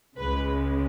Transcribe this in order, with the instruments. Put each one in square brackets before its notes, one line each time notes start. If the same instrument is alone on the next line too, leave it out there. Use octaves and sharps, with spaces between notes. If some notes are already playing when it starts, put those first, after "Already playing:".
[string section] C#2 C#3 G#3 B4